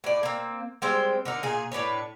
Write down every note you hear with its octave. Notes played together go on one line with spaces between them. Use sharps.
A2 D5
A#3 C4
G3 G#3 C4 C5
D3 D#4 A#4
A#2 G#4
A2 D4 B4 C#5